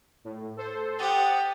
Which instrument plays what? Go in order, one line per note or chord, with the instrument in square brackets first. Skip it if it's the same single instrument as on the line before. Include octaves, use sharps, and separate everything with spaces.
[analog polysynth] A2
A4 C5
[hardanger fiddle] G4 [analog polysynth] F#5 D#6 A6